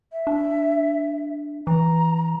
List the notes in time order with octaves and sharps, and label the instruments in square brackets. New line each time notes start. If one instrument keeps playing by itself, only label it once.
[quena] E5
[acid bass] D4
[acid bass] E3 [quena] A#5